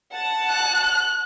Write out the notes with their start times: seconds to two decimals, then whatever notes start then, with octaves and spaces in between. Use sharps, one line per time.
0.12 F#5 A5
0.49 F#6